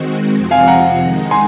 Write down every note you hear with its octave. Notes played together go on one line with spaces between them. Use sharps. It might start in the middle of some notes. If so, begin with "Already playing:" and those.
Already playing: D#3 G#3 C4 F#4
F2 C3 F3 C4
F5 G#5
F#5 A#5
D#3 G#3 D#4
G#5 C6